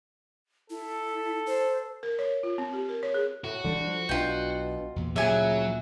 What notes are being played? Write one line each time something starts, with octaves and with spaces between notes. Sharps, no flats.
E4 A4
C5
A#4
C#5
F4
C4
G4
A#4
C#5
G#4
A2 F#4
D3 E3 G3 D4
F3
B1 B2 D4 F4 G5
E2 A#2
D2 A#2 C#3 F#3 E5 G#5